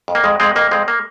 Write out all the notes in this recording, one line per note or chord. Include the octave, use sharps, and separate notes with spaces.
F2
A#3
F2 G#3
F2 G#3 C4
F2 A#3
F2 G#3 C4
A#3